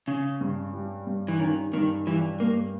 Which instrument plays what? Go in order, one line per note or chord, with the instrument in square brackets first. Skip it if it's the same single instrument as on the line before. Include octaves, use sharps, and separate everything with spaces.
[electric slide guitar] C#3 [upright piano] C#4
[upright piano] G2
G3
G2
[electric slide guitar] E3
[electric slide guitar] D#3 [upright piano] C#4
[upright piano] G2 [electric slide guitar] D#3
[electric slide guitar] E3 [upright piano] G3
[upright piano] G2 [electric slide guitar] A#3